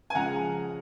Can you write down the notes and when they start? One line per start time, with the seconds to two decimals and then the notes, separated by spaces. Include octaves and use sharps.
0.10 G#5
0.15 C#3 F3 G#3 F#5 A#5